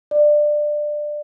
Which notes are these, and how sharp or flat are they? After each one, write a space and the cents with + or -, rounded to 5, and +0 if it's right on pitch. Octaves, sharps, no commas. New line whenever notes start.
D5 +20